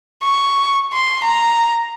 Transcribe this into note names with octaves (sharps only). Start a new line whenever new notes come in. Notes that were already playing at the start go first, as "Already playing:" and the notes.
C#6
C6
A#5